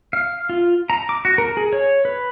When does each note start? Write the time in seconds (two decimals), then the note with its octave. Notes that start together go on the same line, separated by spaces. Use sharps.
0.13 F5
0.49 F4
0.90 A#5
1.09 D6
1.25 F#4
1.38 A#4
1.57 G#4
1.73 C#5
2.05 B4